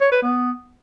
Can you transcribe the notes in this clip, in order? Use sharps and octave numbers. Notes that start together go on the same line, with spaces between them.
C#5
B4
B3